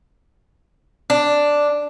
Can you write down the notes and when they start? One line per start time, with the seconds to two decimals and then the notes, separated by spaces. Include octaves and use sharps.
1.10 D4